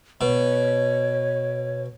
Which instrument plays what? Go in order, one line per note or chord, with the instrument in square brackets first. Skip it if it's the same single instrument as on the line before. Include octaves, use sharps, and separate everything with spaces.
[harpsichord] B2 [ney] C#5